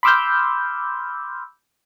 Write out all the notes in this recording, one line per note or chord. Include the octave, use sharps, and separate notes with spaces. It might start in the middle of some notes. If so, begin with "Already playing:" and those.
B5 C6 D6 E6 F6 G6